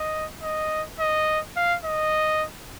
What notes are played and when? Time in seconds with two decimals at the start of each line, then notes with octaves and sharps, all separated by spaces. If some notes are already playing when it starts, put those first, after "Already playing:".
Already playing: D#5
0.43 D#5
1.00 D#5
1.56 F5
1.85 D#5